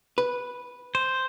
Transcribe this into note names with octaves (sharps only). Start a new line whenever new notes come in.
B4
C5